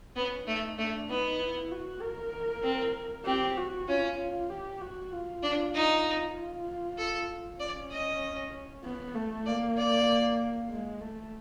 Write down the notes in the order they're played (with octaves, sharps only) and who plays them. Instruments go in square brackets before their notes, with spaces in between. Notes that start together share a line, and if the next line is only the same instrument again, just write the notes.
[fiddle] B3 [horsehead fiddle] C#4
[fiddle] A3 [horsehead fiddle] D#4
[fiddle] A3 [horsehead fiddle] D4
[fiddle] B3 [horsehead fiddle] D#4
[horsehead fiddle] E4
F#4
A#4
[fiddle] C4
[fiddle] C4 [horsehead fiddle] G4
[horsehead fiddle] F#4
[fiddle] C#4 [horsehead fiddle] F4
[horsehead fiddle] F4
G4
F#4
F4
[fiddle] D4
D#4
[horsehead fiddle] F4
[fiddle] A4
[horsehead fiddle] C#4 [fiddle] D5
[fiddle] D#5
[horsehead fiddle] B3
A3
[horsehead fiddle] A#3 [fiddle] D5
[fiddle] D5
[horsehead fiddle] G#3
A3